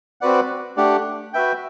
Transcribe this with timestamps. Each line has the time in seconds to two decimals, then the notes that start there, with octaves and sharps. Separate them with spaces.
0.21 C4 F#4 B4 D5 F#5
0.77 A3 D4 G4 D5 F#5
1.33 F#4 B4 E5 G5